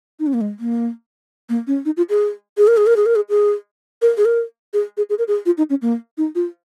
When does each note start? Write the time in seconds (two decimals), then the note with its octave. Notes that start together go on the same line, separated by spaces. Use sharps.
0.20 D#4
0.27 C#4
0.34 A#3
0.41 G#3
0.59 A#3
1.49 A#3
1.67 C#4
1.85 D#4
1.97 F4
2.10 G#4
2.58 G#4
2.68 A#4
2.77 G#4
2.87 A#4
2.96 G#4
3.06 A#4
3.16 G#4
3.29 G#4
4.02 A#4
4.17 G#4
4.25 A#4
4.73 G#4
4.97 G#4
5.10 G#4
5.18 A#4
5.28 G#4
5.46 F4
5.58 D#4
5.70 C#4
5.82 A#3
6.18 D#4
6.35 F4